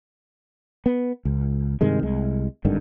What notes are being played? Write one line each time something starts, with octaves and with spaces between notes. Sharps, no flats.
B3
C#2
G2 C3 D#3 G#3
C2 G#3
G#1 G2 D3 D#3